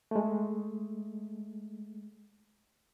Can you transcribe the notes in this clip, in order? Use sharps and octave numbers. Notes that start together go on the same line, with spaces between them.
G#3 A3